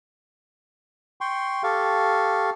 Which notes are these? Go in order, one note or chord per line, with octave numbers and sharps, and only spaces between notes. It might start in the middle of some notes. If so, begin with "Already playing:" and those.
G5 C6 C#6
G4 A4 F5 C#6